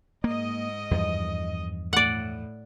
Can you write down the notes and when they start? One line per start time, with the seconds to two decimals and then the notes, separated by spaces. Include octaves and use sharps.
0.24 G#2 A#3 D#5
0.91 E2 G2 F3
1.93 A2 D5 F#5